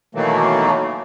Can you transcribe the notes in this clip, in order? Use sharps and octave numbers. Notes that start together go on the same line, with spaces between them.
B2 D#3 E3 F#3 A3 A#3